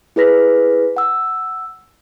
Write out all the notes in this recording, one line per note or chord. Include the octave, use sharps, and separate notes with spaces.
E4 G#4 B4 A#6 B6
F#5 E6